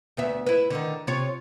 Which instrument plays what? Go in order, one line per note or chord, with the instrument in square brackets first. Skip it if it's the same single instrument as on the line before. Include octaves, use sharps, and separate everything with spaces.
[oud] D2 B3 E5
E4 B4
D3 D#3
C3 F4 C#5